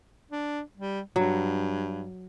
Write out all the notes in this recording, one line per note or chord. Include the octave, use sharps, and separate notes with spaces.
D4
G3
G2 F#3